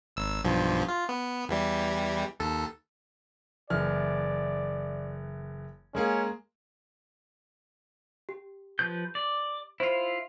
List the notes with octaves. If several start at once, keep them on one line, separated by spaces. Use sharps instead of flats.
G#1 E6
B1 G2 F3
F4
B3
E2 E3 G3
D#2 A4
F#1 E3 D5 F6
G#3 A#3 C#4 G#4
G4
F3 B4 G6
D5
E4 F4 C5 C7